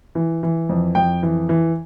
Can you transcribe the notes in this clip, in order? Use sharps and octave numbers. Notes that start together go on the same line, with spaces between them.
E3
E3
F2
F2 G5
E3
E3